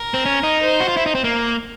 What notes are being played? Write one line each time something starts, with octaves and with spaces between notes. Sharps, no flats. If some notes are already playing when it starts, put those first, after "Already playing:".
Already playing: A#4
C4
C#4
D#4
C5
F#4
F4
E4
D#4
C4
A#3